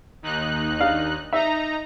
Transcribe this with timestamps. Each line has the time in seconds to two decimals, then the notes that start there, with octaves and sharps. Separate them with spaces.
0.23 D#2 D#4 F#6
0.79 D4 F5
1.33 D#4 E5 A#5